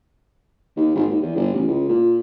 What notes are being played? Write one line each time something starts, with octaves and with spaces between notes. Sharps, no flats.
D#2
G#1
D#2
E2
G1
A1
C#2
A#2